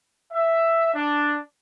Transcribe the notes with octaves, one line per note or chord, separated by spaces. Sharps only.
E5
D4